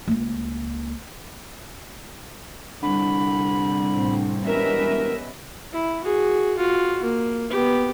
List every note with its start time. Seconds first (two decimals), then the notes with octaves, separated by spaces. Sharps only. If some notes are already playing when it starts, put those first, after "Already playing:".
0.08 C#2 A#3
2.83 C2 D3 B5
3.90 A1 C4
4.47 E1 G3 B3 C#4 A#4 B4 D#5 E5
5.73 E4
6.04 F#4 G#4
6.57 F4 F#4
7.04 A#3
7.50 B3 G4